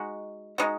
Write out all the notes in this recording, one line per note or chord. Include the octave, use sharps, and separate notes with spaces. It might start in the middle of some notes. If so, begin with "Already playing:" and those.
Already playing: G#3 D#4 F#4
G#3 D#4 F#4